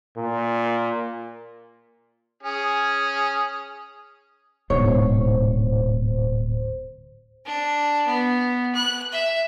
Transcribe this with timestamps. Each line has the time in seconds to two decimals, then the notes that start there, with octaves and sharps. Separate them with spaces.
0.17 A#2
2.43 C#4 G#4
4.70 D1 G#2 B2 C5 C#5
7.46 D4
8.06 B3
8.75 F#6
9.12 E5